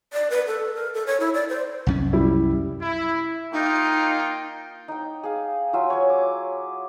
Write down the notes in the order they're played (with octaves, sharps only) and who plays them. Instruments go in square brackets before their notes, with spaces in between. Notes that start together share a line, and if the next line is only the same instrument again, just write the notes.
[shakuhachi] D5
B4
A4
A#4
A4
C#5
E4
D5
C5
[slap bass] C2 F#2 C#4
[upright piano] G3 E4
[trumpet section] E4
[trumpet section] A#3 F4 G5 [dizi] D#4
[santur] D#4 G5
G#4 F5
F#3 F4 E5 G#5
C#5 G#5
D6